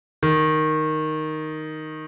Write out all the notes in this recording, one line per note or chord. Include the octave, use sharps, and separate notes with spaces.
D#3